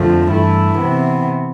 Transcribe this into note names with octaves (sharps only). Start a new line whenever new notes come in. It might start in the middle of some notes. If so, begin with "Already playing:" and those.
Already playing: F2 D3 F3 A3
G2 E3 A3 E4
C3 E3 B3